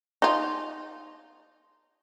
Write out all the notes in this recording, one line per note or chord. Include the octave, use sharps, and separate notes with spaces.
D#4 F4